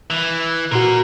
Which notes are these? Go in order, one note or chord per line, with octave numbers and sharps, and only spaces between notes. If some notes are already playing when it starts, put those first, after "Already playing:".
E3
A#2 F#4 A#4 C6